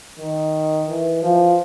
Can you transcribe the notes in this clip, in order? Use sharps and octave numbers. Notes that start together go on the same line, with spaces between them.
D#3
E3
F3